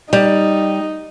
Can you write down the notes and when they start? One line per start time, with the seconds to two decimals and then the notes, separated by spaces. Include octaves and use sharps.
0.13 G3 D#4